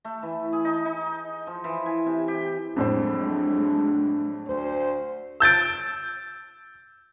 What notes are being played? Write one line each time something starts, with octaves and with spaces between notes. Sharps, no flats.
A3
E3
G#4
D#4
D#4
F3
E3
G#5
C3
G4
F2 A2 F#3 G#3 A3 D4 C5
D2 C5
E6 G6 A6 D7